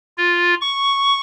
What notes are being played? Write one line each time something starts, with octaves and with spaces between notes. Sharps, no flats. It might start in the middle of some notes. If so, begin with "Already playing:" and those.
F4
C#6